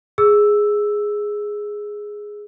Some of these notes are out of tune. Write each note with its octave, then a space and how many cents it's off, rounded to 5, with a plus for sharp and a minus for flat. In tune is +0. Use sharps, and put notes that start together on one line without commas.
G#4 +0 E6 +0